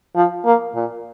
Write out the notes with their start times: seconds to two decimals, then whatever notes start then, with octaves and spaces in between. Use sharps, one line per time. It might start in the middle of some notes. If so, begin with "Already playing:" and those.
0.15 F3
0.45 A#3
0.75 A#2